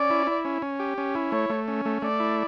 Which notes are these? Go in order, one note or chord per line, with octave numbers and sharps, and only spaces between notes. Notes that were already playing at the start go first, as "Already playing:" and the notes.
Already playing: C#4 D5
E4
E4
C#4
C#4
G4
C#4
E4
A3 C#5
A3
C#4
A3
A3 D5
E4